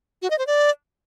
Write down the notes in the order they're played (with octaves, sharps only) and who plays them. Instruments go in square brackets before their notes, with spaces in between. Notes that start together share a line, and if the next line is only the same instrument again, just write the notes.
[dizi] F#4
D#5
C5
D5